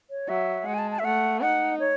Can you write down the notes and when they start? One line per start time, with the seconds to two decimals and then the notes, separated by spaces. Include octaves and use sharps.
0.10 C#5
0.28 F#3 E5
0.66 G#3 F#5
0.74 G#5
0.79 A5
0.91 A5
0.99 E5
1.05 A3 F#5
1.41 D#4 F#5
1.79 C#5